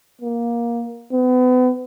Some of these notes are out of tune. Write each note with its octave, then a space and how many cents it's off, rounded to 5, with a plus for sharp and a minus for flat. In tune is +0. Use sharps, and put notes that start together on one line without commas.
A#3 +15
B3 +35